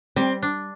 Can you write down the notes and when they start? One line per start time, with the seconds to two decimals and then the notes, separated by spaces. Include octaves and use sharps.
0.16 G3 C4
0.43 D4